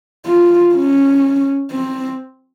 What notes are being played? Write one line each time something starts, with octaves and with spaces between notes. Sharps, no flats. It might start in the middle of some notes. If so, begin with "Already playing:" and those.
F4
C#4
C4